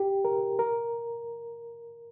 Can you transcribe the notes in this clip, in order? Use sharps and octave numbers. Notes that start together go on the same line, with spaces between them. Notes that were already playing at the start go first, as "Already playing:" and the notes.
Already playing: G4
A#4
A#4